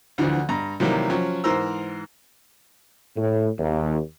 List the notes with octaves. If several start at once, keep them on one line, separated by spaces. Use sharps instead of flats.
D2 D3 E3 F3
G2 A#5
C3 D#3 E3 F#3 G3 A#3
F3 F#3 C#4
G#2 E3 A#4 C5 A#5 E6
A2
D#2